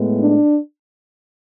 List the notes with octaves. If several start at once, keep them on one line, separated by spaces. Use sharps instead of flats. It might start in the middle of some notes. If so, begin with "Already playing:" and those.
Already playing: A2 G#3 B3
D4